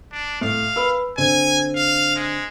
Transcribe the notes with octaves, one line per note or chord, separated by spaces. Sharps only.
D4
A2 F5
B4 B5 E6
D3 C4 G#5
F5
G#3